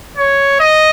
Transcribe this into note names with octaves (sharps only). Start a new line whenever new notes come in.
C#5
D#5